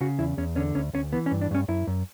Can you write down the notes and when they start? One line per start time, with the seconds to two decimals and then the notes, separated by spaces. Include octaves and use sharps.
0.01 C#3 F#4
0.19 E2 E4
0.37 E2 C#4
0.56 D3 C#4
0.75 D2 C#4
0.93 D2 C#4
1.13 E3 B3
1.26 C#4
1.31 G2
1.41 D4
1.51 G2 C#4
1.68 F#2 E4
1.87 F#2